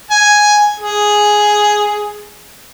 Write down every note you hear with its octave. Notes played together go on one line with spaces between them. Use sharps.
G#5
G#4